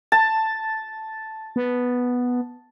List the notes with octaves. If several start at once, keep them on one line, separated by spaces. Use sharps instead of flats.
A5
B3